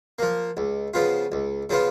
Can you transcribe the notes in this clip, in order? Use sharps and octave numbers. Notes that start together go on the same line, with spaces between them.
F3 A#3
C#2
C#3 F3 B3 F4
C#2
C#3 F3 B3 F4